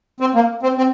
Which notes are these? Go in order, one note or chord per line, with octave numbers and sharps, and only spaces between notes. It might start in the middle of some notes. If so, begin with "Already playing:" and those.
C4
A#3
C4
C4